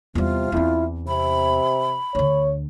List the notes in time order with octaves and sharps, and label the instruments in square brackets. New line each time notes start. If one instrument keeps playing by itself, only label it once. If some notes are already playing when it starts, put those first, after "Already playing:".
[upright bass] E2 G3 [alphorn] C3 [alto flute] F4
[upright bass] E2 C4 [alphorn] E4
[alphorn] C3 [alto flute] B5
[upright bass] D2 D3 [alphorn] C#5